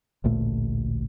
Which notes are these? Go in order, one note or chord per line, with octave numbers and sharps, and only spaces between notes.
A1 D2 A#2 A3